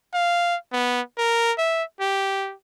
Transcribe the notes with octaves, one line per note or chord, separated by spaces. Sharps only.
F5
B3
A#4
E5
G4